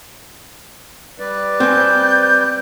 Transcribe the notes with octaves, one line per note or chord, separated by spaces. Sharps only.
G3 B4 D5
C4 G#5 G6